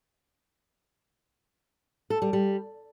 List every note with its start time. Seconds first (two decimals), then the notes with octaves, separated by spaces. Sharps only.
2.10 A4
2.22 G3
2.33 G3